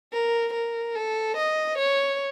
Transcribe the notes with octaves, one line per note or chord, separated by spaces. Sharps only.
A#4
A#4
A4
D#5
C#5